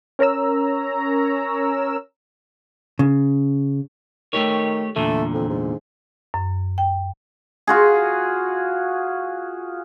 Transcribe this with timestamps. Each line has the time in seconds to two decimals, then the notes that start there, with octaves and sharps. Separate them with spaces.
0.19 C#4 A#4 C#5 A#5 E6
2.99 C#3
4.33 D#3 A3 G4 C#5
4.96 E2 A#2 D3 A3
5.34 F2
5.50 G#2
6.34 F#2
6.78 G5
7.67 F4 F#4 G#4